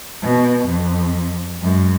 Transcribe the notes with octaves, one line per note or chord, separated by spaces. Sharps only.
B2
F2
F#2 G#3